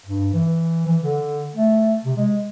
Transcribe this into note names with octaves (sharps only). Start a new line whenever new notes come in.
G2
E3
E3
D3
A3
C3
G#3